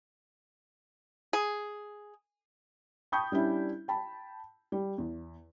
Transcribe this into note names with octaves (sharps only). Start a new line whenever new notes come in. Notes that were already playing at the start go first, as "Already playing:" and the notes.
G#4
G5 A5 B5 C#6 D#6 G6
G3 C#4 D4 E4
G5 A5 B5
G3
E2